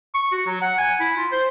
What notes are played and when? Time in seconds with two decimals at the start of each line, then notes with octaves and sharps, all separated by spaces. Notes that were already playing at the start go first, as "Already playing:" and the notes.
0.15 C#6
0.32 F#4
0.46 F#3
0.62 F#5
0.78 G#5
1.00 E4
1.17 F4
1.32 C5